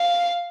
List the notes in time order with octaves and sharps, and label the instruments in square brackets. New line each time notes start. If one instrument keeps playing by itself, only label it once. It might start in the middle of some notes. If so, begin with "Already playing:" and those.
Already playing: [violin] F5